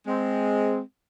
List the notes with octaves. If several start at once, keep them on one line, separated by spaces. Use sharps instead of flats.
G#3 C4